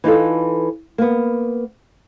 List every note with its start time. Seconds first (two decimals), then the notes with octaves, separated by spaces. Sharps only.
0.04 E3 D#4 F4 A4
0.98 A#3 B3